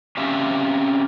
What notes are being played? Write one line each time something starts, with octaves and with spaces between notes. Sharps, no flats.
C4 C#4 G4 E5 F5